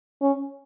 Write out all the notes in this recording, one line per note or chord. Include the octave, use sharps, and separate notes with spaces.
C#4